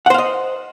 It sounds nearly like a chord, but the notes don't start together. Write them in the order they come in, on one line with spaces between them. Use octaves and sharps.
F#5 C5 F5 D#5